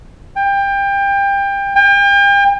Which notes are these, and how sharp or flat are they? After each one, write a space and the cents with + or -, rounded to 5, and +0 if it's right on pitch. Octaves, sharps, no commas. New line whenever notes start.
G5 +25
G5 +40